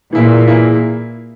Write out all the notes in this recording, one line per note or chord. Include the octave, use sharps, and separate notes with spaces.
A#2 E3 A#3 E4 G#4
E3 A#3 E4 G#4